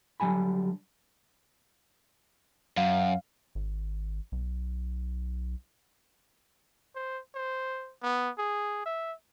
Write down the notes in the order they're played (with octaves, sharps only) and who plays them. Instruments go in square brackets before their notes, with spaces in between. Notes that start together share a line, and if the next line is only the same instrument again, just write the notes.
[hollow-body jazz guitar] D3 F#3 G3 G#5 B5
[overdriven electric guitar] F#2 [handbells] F5
[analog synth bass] G#1
B1
[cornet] C5
C5
B3
G#4
E5